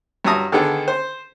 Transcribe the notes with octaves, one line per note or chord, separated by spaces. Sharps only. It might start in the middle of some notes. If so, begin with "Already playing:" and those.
G2 F#3 E5 A5 A#5 D#6
D3 D#3 B3 G#4 A4
C5